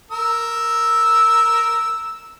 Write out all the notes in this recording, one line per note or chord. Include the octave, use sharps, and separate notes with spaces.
A#4 E6